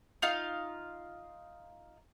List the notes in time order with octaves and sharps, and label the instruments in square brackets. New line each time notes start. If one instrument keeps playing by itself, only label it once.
[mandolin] D#4 F4 F5